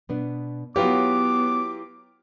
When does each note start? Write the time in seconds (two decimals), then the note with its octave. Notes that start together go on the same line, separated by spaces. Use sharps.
0.09 B2 B3 D4
0.76 F#3 B3 E4 F4 G4 B4 C#5 D6